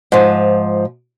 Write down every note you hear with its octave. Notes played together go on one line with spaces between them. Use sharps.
G#2 F3